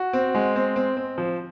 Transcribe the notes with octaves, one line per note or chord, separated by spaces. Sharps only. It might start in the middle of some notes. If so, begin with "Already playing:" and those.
Already playing: F#4
C4
G#3
C4
C4
C4
F3